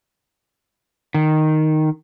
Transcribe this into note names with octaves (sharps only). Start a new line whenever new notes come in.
D#3